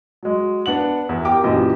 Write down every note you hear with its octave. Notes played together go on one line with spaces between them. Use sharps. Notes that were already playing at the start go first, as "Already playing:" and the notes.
F#3 G#3
B3 D4 F#5 F#7
E2 E4
G4 A#4 G5 D6
A#1 F#2 E3 G4 D#5